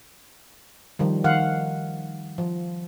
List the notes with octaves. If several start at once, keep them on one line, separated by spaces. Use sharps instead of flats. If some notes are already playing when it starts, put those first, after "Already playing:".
D#3 F3 G3
D#3 F5 F#5
F3